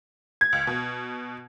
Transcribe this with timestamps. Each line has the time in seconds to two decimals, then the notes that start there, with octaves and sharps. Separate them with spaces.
0.41 G#6
0.53 C#2
0.67 B2